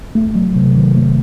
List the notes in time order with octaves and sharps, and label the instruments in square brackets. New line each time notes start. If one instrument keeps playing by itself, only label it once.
[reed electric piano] A3
F#3
C3
D#3
A3